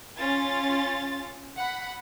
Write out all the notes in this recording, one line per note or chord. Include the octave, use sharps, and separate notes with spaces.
C#4 F4 A6
F#5 B5